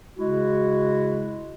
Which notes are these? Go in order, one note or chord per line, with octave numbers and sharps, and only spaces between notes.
C#3 G#3 E4 F#4